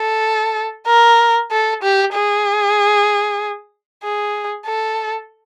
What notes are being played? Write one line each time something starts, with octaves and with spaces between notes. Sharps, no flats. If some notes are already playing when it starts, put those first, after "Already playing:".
Already playing: A4
A#4
A4
G4
G#4
G#4
A4